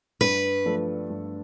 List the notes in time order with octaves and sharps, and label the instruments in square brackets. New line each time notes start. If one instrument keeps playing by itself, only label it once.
[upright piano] G2 [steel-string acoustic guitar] B4
[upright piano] F3 A3 D4 A4
G2